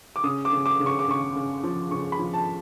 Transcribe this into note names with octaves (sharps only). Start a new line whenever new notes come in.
D6
C#3 D#6
D6
C#3
D6
C#3
C#6
D6
C#3 C#6
C#3
F3
C#3 C#6
B5
F3
A5